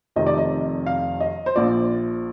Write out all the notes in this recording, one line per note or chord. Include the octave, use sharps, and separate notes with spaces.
F1 F2 C3 D#3 D#5
D5
D#5
F5
D#5
C5
A#1 A#2 F3 D5